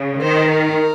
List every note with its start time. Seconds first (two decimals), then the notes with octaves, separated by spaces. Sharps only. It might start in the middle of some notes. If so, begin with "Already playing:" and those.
Already playing: C#3
0.22 D#3 C5
0.50 A#4